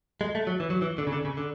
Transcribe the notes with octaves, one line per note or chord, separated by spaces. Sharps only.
G#3
A3
F#3
E3
F#3
E3
D3
C#3
D3
C#3
D3